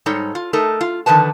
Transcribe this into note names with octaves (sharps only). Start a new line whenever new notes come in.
G#2 G3 D#4 A4 C#5
F4
A3 D#4 A4 A#4
F4
D3 D#3 F3 B4 A5